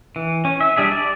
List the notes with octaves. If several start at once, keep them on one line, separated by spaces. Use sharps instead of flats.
E3
C#4
E5
G3 D4 G#4 E5
D5